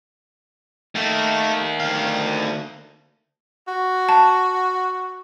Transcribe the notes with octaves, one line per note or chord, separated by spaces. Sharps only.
D#3 A3 A#3
D2 F5
F#4
A5